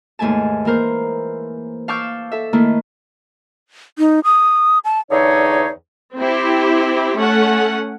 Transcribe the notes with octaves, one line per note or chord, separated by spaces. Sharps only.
D#2 G#2 A3 G#5 A5
E3 A#3 A#4 C5
F5 A5 C#6 D6 E6 G6
A4 E5
D#3 A3 A#3 E4
D#4
D#6
A5
E2 D3 E3 D#4 G#4 C#5
C4 E4 G4
A3 C#4 F#5